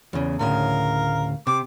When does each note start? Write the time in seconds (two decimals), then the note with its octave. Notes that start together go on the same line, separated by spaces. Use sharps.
0.13 E2 C#3
0.39 D2 A2 C#3 A#4 F5
1.47 C3 D6